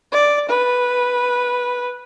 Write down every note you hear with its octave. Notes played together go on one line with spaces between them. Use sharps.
D5
B4